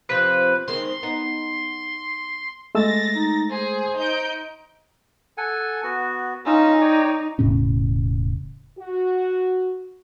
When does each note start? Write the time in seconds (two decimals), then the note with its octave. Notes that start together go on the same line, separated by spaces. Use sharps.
0.09 C3 F3 B4
0.68 D#3 G#3 C4 C6
1.03 B3 D#4
2.75 G#3 A3 E6 A6 A#6
3.15 D#4
3.51 G#4 C5
3.97 D#4 G6 D7
5.38 A4 F#5 G#5
5.84 B3 F#4
6.46 C#4 D#4 F4 E6
6.81 C#5 D5 G5
7.39 E1 A2 C#3 C#4
8.78 F#4